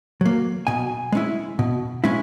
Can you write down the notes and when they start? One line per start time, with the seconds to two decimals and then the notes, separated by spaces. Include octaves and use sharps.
0.21 F#3 A#3
0.67 B2 G#5
1.12 G#3 C#4 E4
1.59 B2
2.04 G#3 C#4 E4